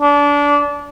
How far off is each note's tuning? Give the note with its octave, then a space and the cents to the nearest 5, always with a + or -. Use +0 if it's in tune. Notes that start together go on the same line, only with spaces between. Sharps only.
D4 -25